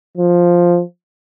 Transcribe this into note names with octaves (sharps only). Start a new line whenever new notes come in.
F3